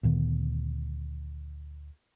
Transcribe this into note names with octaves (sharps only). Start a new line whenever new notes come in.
D2 A#2 D#3 B3